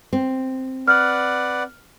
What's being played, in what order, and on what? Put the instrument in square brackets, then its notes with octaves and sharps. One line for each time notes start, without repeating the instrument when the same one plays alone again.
[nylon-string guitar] C4
[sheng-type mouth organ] B4 D5 F#5 [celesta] F6